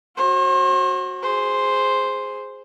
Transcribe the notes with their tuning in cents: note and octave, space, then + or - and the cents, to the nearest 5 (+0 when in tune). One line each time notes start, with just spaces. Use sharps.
F#4 +0 C5 +40
G#4 +0 C5 +0